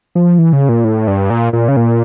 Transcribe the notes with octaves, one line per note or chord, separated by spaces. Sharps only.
F3
E3
C#3
A#2
A2
G2
A#2
A#2
C#3
A#2